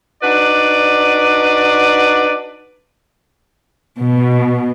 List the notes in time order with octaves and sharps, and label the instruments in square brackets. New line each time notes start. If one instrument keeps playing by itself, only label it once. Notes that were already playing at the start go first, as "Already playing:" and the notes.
[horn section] D4 D#4 F#4 B4 D5
[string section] B2